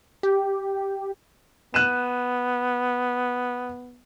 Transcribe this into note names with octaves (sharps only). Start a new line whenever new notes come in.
G4
B3 F#6 D#7 E7